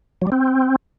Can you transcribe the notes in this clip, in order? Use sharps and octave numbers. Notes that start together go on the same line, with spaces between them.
F#3
G3
C4